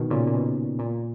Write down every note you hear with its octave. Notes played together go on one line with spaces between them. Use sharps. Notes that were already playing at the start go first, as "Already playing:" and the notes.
Already playing: B2 D#3
A#2 C#3
A#2
B2
A#2